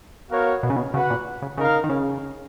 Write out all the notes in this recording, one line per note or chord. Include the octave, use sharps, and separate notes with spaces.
B3 F#4 A#4 C#5 F5
B2
C#3
B2
C#3 F#4 B4 F#5
A#2
C#3
C#3 D#4 A#4 F5
D#3
C#3